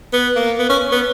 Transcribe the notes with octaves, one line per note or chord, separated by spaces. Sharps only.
B3
A#3
B3
C#4
B3